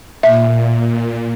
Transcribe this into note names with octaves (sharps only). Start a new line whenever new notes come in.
A#2 E5